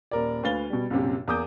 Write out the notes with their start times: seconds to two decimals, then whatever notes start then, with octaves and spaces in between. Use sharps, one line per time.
0.11 D#1 A#4 D5
0.43 D2 B4 F5 A6 G7
0.70 B2 G3
0.90 A#1 F#2 C3 G4
1.28 E2 A#3 D6 D#6 G6